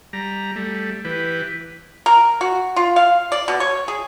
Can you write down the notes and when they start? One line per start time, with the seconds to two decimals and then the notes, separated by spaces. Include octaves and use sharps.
0.13 G3 A#5
0.56 G3 A3
1.05 E3 G4 B4
2.06 A#4
2.41 F#4
2.76 F4
2.96 F5
3.32 D5
3.48 B2
3.60 C#5
3.88 G#4